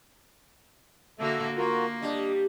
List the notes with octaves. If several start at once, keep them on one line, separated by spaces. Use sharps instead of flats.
D3 A#3 F#4 A4 E5
A#3 F4 F#4 A#4
G3 D4 D#5